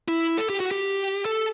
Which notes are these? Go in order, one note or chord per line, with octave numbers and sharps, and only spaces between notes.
E4
A4
G4
F#4
G4
A4